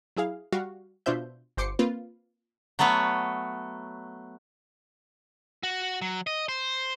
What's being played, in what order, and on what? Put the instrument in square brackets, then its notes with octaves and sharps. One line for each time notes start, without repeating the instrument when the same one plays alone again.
[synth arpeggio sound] F#3 E4 G#4 F5
G3 F#4 F5
B2 D4 F4 C5 E5 G6
G1 C5 D6 C7 C#7
A#3 C4 F4 B4
[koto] F#3 A3 B3 B4 C#5
[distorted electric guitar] F#4
F#3
D#5
C5